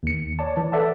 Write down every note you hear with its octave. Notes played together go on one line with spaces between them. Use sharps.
D#2 C#7
C#5 D5 A5
E3
A4 B4 D5 E5 F#5 A5